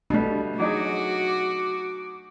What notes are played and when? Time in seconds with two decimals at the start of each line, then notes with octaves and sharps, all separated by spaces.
0.10 B2 G3 A3 B3 D4
0.60 F#3 D#4 F#4 G#4 D6